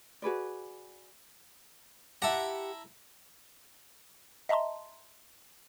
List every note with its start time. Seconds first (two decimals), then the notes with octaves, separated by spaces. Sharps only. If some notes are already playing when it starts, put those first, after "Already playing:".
0.22 F#4 G#4 B4 D5
2.22 E4 G4 F#5 A5 A#5
4.49 D#5 E5 A5 A#5 C6